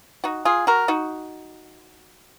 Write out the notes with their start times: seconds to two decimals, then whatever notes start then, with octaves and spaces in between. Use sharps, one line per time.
0.24 D#4 F#4
0.45 F4 G#4
0.67 F#4 A#4
0.88 D#4 F#4